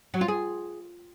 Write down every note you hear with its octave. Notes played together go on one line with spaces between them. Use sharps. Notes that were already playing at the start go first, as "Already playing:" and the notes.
F#3
F4
G#4